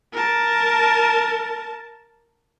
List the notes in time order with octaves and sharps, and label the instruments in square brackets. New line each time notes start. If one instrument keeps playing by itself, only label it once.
[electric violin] A#4 A5